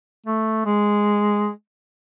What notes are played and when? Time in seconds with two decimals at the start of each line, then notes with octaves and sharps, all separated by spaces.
0.26 A3
0.66 G#3